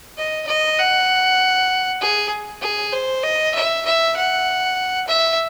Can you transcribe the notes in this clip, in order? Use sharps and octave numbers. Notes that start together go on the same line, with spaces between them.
D#5
D#5
F#5
G#4
G#4
C5
D#5
E5
E5
F#5
E5